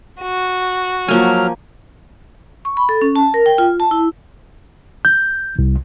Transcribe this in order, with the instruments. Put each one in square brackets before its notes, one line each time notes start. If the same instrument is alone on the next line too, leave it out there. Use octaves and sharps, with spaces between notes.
[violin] F#4
[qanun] F3 A#3 G#5 [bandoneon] F#3 F6
[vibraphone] C#6
B5
A4
C#4
A5
A#4
G5
F4
A5
E4
[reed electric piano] G6
C2